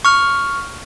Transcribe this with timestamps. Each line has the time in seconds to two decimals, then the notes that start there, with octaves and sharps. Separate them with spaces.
0.05 C#6 F6